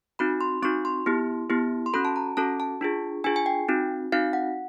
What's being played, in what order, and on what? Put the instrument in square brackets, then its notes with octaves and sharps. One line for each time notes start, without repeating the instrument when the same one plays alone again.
[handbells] C4 D#4 F#4 B5
C6
C4 D#4 F#4 C#6
C6
B3 E4 G4
B3 E4 G4
C6
C#4 F#4 A4 B5
A5
A#5
C#4 F#4 A4 A5
A5
D4 F4 G#4
D4 F4 G#4 G#5
G#5
G5
C4 D#4 F#4
C4 D#4 F#4 F5
F#5